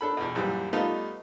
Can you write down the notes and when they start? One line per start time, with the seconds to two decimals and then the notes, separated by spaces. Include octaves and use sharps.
0.01 D4 A4 B5
0.17 E2 B2
0.35 A#1 F#2 E3 G3
0.73 G3 A3 B3 D#4 F4